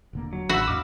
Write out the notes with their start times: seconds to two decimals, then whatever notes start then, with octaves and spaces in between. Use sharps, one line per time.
0.13 E1 D3 A#3
0.33 F#3
0.49 A1 F#4 B5 E6
0.68 E2 G#2 D#5 F5 D6